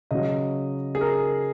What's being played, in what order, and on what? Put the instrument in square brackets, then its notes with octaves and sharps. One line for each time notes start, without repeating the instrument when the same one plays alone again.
[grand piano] C#3 F#3 D#5
G#4
A#4